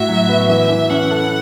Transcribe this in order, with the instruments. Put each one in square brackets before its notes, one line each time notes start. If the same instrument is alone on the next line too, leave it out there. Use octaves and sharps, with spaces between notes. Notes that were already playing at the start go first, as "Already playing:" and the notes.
Already playing: [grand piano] A2 F#4 [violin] E5
[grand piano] F#3
B3
[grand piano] E3 [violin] E5
[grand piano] E3
[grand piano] C#4 [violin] F#5
[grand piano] A4